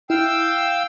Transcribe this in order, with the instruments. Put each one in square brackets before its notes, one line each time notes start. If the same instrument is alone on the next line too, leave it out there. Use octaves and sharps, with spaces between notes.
[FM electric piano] E4 [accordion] F5 G5 E6